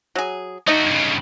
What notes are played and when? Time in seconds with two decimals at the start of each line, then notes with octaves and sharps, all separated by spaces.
0.15 F#3 G#4
0.67 A3 D#4 F#4 D#5
0.86 G2 C#3